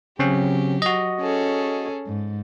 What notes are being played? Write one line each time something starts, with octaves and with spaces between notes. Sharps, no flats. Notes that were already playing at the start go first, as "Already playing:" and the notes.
C#3 F#3 C4 C#4 G4
F#4 D#5
C#4 G#4 A4
G#2